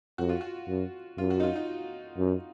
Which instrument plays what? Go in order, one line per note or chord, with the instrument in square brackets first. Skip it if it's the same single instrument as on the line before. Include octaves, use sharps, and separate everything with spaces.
[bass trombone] F2 [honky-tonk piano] F#4
[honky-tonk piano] F4
F#4
[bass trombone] F#2
[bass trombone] F#2 [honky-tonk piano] F4
[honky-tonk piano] F#4
D#4
F4
D#4
[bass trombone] F#2